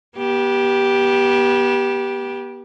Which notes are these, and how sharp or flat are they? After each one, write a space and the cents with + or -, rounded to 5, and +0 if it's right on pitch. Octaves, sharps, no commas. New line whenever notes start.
B3 -30 G4 +0